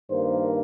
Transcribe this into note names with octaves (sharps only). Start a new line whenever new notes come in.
G2 D#3 A#3 C5